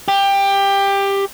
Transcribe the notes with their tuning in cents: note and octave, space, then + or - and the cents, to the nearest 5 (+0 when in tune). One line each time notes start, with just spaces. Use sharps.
G4 +15